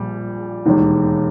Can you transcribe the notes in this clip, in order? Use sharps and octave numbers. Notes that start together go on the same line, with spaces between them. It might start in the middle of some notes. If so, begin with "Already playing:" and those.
Already playing: A#1 A#2 G3
E1 D#2 D#3